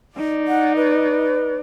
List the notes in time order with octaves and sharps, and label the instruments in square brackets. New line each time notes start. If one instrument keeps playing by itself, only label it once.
[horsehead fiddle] D#4 D5
[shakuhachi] F#5
B4